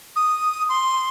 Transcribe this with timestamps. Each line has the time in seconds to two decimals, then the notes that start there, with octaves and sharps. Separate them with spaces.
0.16 D#6
0.69 C6